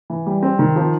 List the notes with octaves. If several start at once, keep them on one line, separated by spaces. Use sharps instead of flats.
E3
G3
C4
D#3
F3